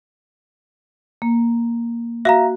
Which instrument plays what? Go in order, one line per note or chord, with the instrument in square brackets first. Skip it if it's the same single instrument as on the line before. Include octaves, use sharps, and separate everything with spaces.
[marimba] A#3
[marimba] F#4 [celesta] E5 F5 A#5